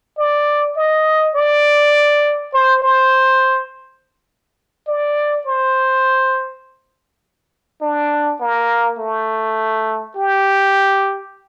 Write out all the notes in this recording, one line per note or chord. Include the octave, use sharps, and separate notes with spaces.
D5
D#5
D5
C5
C5
D5
C5
D4
A#3
A3
G4